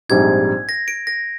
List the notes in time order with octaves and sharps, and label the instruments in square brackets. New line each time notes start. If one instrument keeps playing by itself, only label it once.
[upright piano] A#1 G#2 G3 C4 D#4 [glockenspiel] G#6
[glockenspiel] A#6
D7
A#6